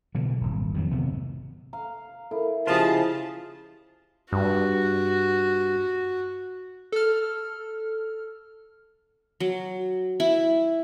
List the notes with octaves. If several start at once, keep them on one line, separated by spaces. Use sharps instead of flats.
B2 D3 E3 F#3
D#1 G#1
F2 D#3 F3 F#3
G#1 D2 C3 B3
F5 A#5
E4 A4 A#4
C#3 F3 F4 G4 G#4 C5 D#5 A5
G2 F#4
A4 F6
F#3
E4